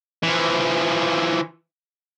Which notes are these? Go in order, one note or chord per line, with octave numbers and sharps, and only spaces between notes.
E3 F3